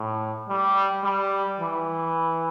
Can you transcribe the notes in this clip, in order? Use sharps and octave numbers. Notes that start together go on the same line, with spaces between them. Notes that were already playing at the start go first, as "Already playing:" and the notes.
Already playing: A2
G3
G3
E3